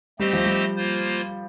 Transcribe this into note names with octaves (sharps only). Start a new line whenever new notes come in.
G3 A3 C4 G4 C5 D#5
F3
G3
A#3 F4 C5